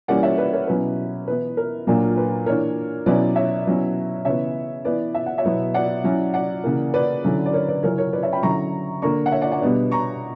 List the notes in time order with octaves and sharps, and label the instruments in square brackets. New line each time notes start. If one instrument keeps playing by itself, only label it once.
[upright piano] E3 G3 A#3 C#4 D5 F#5
C#5 E5
B4 D5
A#4 C#5
B2 F#3 C#4 E4 B4
E3 B3 E4 B4
A#4
A#2 F#3 A#3 D4
B4
E3 A#3 D4 A#4 C#5
B2 F#3 C#4 E4 B4 D5
C#5 E5
B2 F#3 C#4 E4
C#3 E3 B3 C#5 E5
E3 B3 E4 B4 D5
E5
F#5
C#5 E5
B2 F#3 B3 E4
D5 F#5
F#3 C#4 E4
D5 F#5
C#3 E3 A#3
B4 D5
D3 F#3 C#4 E4
D5
A#4 C#5
B4 D5
C#3 F#3 C#4 E4 A#4 C#5
A#4 C#5
B4 D5
C#5 E5
G5 B5
D3 F#3 C#4 E4 A#5 C#6
D3 A#3 D4 A#5 C#6
F#5
C#5 E5
D5 F#5
D5 F#5
B2 G3 B3 D4
A#5 C#6